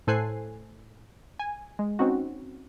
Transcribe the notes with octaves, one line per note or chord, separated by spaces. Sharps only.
A2 A4 C5 G#5 F#6 C7
G#5
G#3
C4 C#4 D#4 F#4